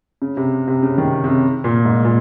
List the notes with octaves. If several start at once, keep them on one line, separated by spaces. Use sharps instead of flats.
C#3
C3
C3
C#3
D#3
C3
C#3
A#2
G#2
A#2